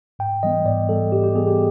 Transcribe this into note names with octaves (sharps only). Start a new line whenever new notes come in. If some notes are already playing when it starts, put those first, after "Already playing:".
G#2 G5
E3 G3 B3 D#5
G#2 D5
E3 G3 B3 A4
G#2 G4
G4
E3 G3 B3 G#4
G4